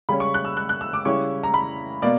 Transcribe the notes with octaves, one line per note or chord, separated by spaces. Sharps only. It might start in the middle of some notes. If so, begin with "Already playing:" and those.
C#3 G3 C#4 B5
C#6
F#6
E6
F#6
F#6
E6
D6
C#3 G3 C#4 E4 C#6
A#5
B5
B2 A#3 D5